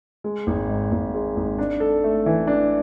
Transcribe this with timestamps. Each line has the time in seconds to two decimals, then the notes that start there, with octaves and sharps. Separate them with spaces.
0.24 G#3
0.47 G#1
0.69 G#2
0.92 G#1
1.14 G#3
1.36 G#1
1.58 D4
1.80 A4
2.04 A3
2.26 E3
2.47 D4